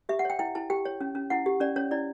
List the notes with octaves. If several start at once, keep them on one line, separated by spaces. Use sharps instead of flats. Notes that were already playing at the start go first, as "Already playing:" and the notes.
G4 E5
F#5
C#5 G5
E4 G5
E4 A5
G4 G5
C#5
C#4
C#4
E4 F#5
G4
C#4 D5
C#4 C#5
E4 D5